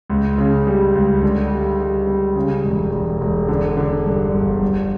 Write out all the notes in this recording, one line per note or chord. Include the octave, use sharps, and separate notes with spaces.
C#2
C#3
G3
C#2
D3
G3
G3
G3
C#3
E1
E1
E1
D3
D3
G2
G1
G2